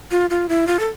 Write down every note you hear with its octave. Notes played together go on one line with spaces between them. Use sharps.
F4
F4
E4
F4
A4